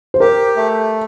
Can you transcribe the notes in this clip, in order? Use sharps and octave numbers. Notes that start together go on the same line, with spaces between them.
C5
G4 A#4
A3